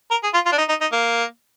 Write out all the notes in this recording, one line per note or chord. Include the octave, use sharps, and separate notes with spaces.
A#4
G#4
F4
F4
D4
D#4
D#4
D#4
A#3